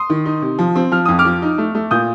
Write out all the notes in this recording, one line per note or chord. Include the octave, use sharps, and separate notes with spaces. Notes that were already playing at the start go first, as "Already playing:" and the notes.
Already playing: C6 D#6
D#3
D#4
C3
F3
C4
F3 F6
F2 D#6
D6 F6
F3
D#4
A3
A3
A#2 D#6 G6